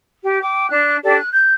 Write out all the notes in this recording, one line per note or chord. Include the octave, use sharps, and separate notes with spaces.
G4
G5 D6
D4 F#6
D4 G4 A4 D5
F#6
G6